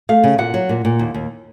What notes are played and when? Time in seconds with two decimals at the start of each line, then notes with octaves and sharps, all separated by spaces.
0.09 A3 F5
0.24 C#3
0.38 A#2 F#5
0.54 F#3
0.69 A#2
0.85 A#2
0.99 D#2
1.14 D#2